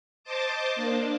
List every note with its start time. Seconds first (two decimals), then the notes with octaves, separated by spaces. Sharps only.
0.24 C5 D#5 A5 D6
0.76 A#3 D4